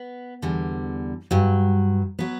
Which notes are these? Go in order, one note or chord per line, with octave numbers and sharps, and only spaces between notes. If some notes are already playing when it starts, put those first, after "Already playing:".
Already playing: B3 B4
E2 D3 G3
G2 F#3
F#3 B3 B4